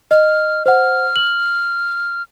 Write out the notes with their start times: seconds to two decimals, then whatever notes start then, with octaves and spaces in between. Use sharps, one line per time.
0.11 D#5 F6
0.66 C5 F#5 F6
1.16 F#7